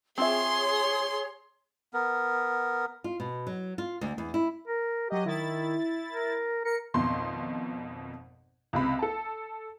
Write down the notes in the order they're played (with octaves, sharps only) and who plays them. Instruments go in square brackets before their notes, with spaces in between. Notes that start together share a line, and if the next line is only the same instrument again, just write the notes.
[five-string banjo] C4 F4 E5 [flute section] G#4 C#5 [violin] C6
[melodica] B3 A#4
[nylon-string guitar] F4
B2
F#3
F4
D2
E2
E4
[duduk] A#4
[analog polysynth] F#3 D#5 [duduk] G4
[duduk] D#3 [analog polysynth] E4 A6
[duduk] A#4
[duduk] A#4 [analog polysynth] C#7
[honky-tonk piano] G#1 F2 B2 C6
C#2 C3 B5
A4 A5